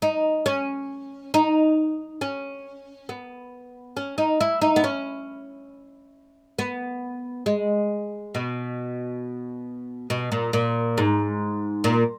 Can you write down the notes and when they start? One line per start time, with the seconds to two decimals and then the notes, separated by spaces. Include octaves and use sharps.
0.02 D#4
0.46 C#4
1.34 D#4
2.21 C#4
3.09 B3
3.97 C#4
4.18 D#4
4.41 E4
4.61 D#4
4.76 B3
4.84 C#4
6.59 B3
7.46 G#3
8.35 B2
10.10 B2
10.32 A#2
10.53 A#2
10.98 G#2
11.84 A#2